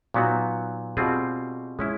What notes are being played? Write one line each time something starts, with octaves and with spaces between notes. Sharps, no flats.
A#2 F#3 B3 D#4 F#4
B2 G3 C4 F4 G#4
G#3 C#4 E4